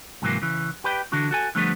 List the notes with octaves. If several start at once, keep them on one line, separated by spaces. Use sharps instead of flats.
G#2 C3 E3 F#3 G3 A#3
C#3 E3
G4 B4 D5 G5
D3 E3 D4 F#4
F#4 A4 G#5
D3 F3 G3 A3 B3